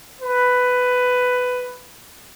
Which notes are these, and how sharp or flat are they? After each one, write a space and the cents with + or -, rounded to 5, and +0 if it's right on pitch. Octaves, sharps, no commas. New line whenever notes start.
B4 +10